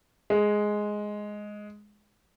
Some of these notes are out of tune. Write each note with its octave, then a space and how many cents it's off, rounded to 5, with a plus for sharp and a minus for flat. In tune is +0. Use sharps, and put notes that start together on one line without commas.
G#3 +5